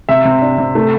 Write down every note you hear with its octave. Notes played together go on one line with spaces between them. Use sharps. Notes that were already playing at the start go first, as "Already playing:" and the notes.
C3 E5
C3
D4
C3
A3